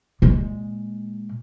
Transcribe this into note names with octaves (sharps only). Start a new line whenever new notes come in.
A#2 G#3